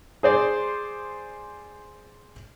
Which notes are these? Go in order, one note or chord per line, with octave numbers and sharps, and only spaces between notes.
G#4 C5 D5